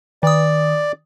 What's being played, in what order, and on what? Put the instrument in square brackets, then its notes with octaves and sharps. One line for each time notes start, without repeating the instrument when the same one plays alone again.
[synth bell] D#3 D#6 [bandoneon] D5